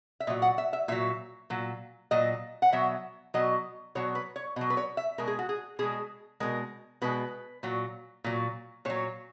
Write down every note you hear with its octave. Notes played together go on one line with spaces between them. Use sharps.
E5
A#2 F#3 D#5
F#5
E5
E5
A#2 F#3 E5
A#2 F#3
A#2 F#3 D#5
F#5
B2 F#3 E5
B2 F#3 D#5
B2 F#3 C#5
B4
C#5
B2 F#3 D#5
B4
C#5
E5
B2 G#3 A#4
G#4
F#4
G#4
B2 G#3 G#4
B2 G#3 A#4
B2 G#3 B4
A#2 F#3
A#2 F#3
A#2 F#3 C#5